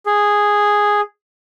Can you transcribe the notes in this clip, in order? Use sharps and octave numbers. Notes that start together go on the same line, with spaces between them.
G#4